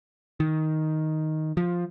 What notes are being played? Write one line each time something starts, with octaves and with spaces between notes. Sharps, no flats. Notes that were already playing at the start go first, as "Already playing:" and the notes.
D#3
F3